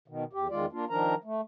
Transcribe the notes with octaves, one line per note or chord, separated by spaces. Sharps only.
B2 D#3
E2 G4
E2 D#3 G#3 F4 D5
A#3 D4 F4
D#3 F3 D4 A#4 A#5
A3